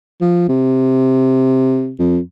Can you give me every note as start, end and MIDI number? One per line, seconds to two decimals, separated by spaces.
0.21 0.45 53
0.49 1.93 48
1.99 2.20 41